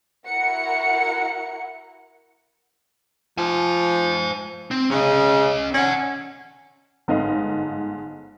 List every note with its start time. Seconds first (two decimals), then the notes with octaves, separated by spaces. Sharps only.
0.27 E4 F#4 A#4 F#5 C#7
3.38 F3 C5 G#5
4.71 C4
4.91 C#3 C#4 D#5
5.74 C#4 D5 F#5
7.08 G1 G#2 A4 D#5 F5